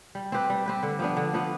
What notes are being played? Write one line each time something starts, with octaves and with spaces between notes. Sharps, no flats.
G3
C4 G4 B4
G3
C4 G4 B4
D3
F3 B3 D4
D3
F3 B3 D4